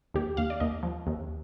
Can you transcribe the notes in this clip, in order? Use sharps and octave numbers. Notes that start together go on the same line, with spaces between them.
D#2 G4
D#2 F5
D5
D#2 D#5
F3
D#2